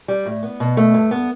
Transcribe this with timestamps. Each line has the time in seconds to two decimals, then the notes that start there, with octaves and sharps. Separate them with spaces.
0.08 G3
0.26 A2
0.43 B3
0.60 B2
0.77 A3
0.94 G2
1.11 B3